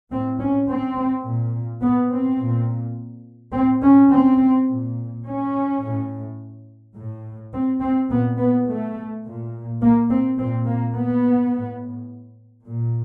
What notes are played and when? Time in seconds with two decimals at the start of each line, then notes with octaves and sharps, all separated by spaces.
0.11 A2 C4
0.40 C#4
0.69 C4
1.25 A#2
1.82 B3
2.11 C4
2.39 A#2
3.53 A2 C4
3.82 C#4
4.10 C4
4.67 A#2
5.25 C#4
5.81 A2
6.96 A2
7.53 C4
7.82 C4
8.09 A#2 B3
8.39 B3
8.67 A3
9.24 A#2
9.81 A#3
10.10 C4
10.38 A#2 C4
10.67 A#3
10.95 B3
11.52 A2
12.66 A#2